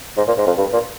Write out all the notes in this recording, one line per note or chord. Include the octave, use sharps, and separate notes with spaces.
G#2
A#2
G#2
F2
G2
A#2